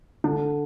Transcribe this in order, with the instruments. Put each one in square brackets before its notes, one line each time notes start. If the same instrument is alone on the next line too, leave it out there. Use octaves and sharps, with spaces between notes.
[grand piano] D3 [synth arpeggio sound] D4